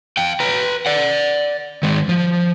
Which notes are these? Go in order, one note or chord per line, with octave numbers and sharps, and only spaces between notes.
F5 G5
B4 A#5
D5 F#5
D#3 G#3
F3